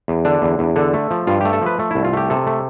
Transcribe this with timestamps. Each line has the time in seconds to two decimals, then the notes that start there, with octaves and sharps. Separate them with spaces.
0.08 E2
0.25 D3 D4
0.42 E2
0.59 E2
0.76 D3 A4
0.94 A3
1.11 F3
1.27 G2 F4
1.41 A3 G4
1.53 A4
1.62 F3 B4
1.79 A3
1.91 C2 E4
2.04 F4
2.13 A3 G4
2.30 C3 A4
2.47 A3